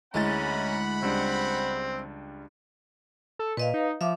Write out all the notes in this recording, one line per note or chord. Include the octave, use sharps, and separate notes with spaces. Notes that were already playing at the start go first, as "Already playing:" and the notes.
D2 G#3 C#4 E4 F#5 A#5 B5 A6
C#2 G3 C4 D4
A4
A#2 B4 D#5 F5
D#4
F3 E5 F5 D6